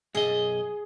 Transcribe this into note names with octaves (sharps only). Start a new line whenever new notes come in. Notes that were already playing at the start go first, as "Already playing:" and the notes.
B1 F#2 G#4 D#5